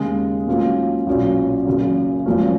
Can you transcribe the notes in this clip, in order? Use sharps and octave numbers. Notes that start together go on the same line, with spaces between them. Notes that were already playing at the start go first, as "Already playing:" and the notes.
Already playing: D#2 C#3 G#3
G#2 F#3 A#3 C#4 F4
B1 A#2 F#3 C#4
F#1 F#2 C#3
G#1 F#2 F3 A#3 C#4